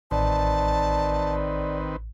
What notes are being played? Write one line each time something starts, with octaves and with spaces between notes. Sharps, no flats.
A1 D#3 C4 B4 D5 A5